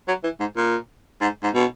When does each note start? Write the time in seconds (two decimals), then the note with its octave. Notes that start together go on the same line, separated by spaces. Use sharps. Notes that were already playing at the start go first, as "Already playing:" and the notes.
0.08 F#3
0.24 E3
0.40 G#2
0.57 A#2
1.21 G#2
1.43 G#2
1.54 B2